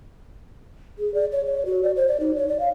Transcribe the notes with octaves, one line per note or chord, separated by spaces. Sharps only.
G#4
D5
C#5
C#5
F#4
D5
C5
D5
D#4
C#5
D5
F5